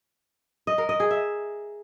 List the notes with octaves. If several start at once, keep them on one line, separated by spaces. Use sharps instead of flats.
D#5
A#4
D#5
G#4
E5